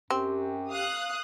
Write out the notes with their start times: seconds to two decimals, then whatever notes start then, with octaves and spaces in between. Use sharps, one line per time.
0.10 F#2 C4 G4
0.71 F5 D#6 F#6